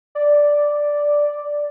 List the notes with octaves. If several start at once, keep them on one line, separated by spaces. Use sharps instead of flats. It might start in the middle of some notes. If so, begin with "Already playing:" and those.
D5